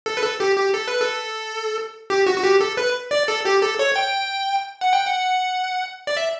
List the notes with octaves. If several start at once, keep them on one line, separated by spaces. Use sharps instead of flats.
A4
B4
A4
G4
G4
A4
B4
A4
G4
F#4
F#4
G4
A4
B4
D5
A4
G4
A4
C#5
G5
F#5
G5
F#5
D5
E5